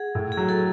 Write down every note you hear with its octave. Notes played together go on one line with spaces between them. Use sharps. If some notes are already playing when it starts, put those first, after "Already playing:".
Already playing: G#4 F#5
A2
G#4
F#3
A4